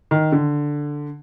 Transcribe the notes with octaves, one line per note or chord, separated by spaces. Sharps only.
D#3
D3